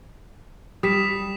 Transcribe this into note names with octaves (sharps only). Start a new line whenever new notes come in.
G3 D#6 B6 E7